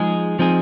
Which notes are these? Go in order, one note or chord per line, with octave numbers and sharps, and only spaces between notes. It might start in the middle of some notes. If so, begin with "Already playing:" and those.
Already playing: F3 G#3 D#4 G#4
F3 C4 D#4 G#4